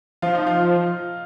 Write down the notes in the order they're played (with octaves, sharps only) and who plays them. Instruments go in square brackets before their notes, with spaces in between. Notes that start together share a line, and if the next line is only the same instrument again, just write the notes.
[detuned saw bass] F3 [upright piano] F4
[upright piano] D#4
F4